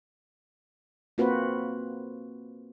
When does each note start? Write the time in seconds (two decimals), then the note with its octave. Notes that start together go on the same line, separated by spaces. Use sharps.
1.18 A#3 C4 F4 F#4 B4 C5